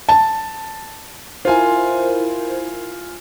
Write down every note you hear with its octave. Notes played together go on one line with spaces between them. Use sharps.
A5
E4 F4 A#4 C5 G#5